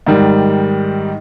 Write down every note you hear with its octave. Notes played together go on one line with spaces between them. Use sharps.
G#2 D#3 G3